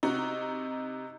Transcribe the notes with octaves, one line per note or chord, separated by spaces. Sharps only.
C3 D#4 F#4